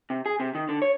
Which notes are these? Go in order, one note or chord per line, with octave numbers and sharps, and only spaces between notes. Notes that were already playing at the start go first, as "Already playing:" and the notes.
C3
G#4
C3
D#3
D3
C#5